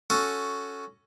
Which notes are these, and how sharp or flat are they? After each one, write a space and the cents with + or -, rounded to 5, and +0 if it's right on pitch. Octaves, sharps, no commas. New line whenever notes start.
C#4 +5 F#4 +0 A4 +0